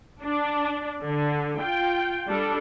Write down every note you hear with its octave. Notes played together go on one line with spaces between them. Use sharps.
D4
D3
F4 G5
G3 D4 A4